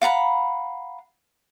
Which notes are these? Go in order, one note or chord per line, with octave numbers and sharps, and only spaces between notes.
F5 F#5 A#5 B5